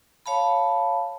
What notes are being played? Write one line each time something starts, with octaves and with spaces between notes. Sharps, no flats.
C#5 F5 A5 B5